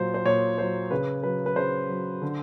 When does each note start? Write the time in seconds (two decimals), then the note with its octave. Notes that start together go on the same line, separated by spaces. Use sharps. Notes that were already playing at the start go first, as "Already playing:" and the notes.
Already playing: A#2 F#3 C5
0.14 C5
0.26 A#2 C#5
0.58 F#3 C5
0.91 C#3 B4
1.23 F#3 B4
1.46 B4
1.56 C#3 C5
1.89 F#3
2.22 D3